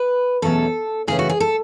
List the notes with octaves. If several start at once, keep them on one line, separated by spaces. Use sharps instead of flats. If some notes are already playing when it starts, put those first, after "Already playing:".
Already playing: B4
E2 B2 F#3 A3 C#4 A4
C#3 E3 A3 C#4 G#4
F#4
G#4
A4